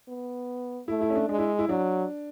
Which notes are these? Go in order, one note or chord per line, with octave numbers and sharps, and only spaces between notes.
B3
A3 E4
E4
C#4
D4
G#3 D4
E4
E4
F#3 D4